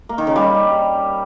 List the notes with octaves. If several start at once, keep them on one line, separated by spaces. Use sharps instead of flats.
A#3
D#3
C#3
G3